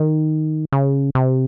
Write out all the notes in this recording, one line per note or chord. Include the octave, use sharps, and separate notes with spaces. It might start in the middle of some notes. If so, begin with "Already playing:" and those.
Already playing: D#3
C#3
C3